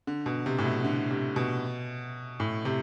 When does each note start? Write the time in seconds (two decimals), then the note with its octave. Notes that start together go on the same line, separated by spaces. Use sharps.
0.07 D3
0.26 B2
0.46 C3
0.59 A2
0.65 B2
0.85 D3
1.10 C3
1.36 B2
2.40 A2
2.65 C3